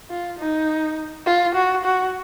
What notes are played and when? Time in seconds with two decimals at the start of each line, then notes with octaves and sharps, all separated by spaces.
0.10 F4
0.39 D#4
1.26 F4
1.55 F#4
1.84 F#4